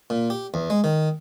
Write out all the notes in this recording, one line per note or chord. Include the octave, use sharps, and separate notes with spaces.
A#2
G4
E2
G#3
D#3